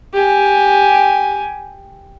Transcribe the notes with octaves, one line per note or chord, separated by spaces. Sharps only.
G4 G#5